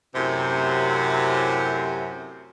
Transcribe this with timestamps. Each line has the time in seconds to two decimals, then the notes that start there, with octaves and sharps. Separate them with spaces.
0.15 F#2 A2 C3